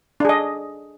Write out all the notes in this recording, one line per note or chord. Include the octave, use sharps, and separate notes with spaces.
D4 G#4 D#5